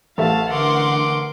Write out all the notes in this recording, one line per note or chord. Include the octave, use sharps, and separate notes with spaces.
A1 A4 E5 F5 A5
D3 A#4 F#5 C6 D6